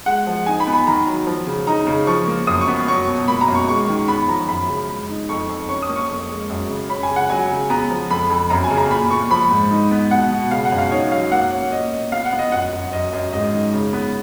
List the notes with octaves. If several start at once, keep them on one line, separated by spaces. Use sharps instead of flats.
G#3 F#5
F3
D#4 G#5
B5
B3
B5
D#3 A#5
F#3
F3
C#3
D#4 A#5
C#3
F3 C#6
A#3
F#2 D#6
C#6
B3
F#3 C#6
B2
A#3 B5
A#5
F#2
C#6
G#3 C#6
D#3
B3 B5
F3 A#5
F#2 B5
C#3
G#3
D#4
F2 C#6
F2
C#4 C#6
D#6
A#3
C#6
F2
G#3
F#2
C#3
C#4 B5
G#5
C#3
F#5
F#3 G#5
C#3
B3 A#5
F3
F2 B5
F2
F#2 A#5
G#5
C#3
A#5
A#2 B5
A#2 C#6
F3 B5
G#2
D#4
B3
B2 F#5
B2
C#3 F5
F#5
F#2
F5
D#4 C#5
F#3 F5
A#3 F#5
C#4
A#2 D#5
A#2
B3 F5
F#5
B3
D#5
F#2 F#5
F#2
F#2 D#5
F#2
G#2 D#5
D#3
C#3
B3